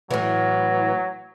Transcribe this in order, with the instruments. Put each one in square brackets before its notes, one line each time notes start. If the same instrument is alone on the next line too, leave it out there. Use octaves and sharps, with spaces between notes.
[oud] A2 E3 [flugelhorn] F#3